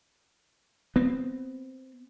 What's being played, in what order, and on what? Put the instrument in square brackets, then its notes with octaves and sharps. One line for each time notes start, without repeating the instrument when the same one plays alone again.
[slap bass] B3 C4